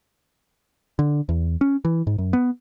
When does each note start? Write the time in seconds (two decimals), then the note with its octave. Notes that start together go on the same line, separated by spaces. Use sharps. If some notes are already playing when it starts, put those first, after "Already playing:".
0.99 D3
1.29 E2
1.61 C#4
1.85 E3
2.07 G#2
2.18 F#2
2.33 B3